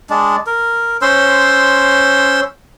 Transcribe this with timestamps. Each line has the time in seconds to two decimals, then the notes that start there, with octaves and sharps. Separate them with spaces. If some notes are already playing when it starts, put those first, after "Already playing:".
0.10 G#3 D4
0.47 A#4
1.02 C#4 C5 C6 E6